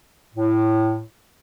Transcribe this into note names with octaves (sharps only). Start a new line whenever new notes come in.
A2